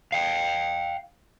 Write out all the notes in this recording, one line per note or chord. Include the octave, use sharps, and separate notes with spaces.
F5 G5